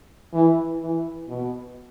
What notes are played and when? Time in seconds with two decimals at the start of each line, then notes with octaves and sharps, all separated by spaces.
0.34 E3
0.81 E3
1.28 B2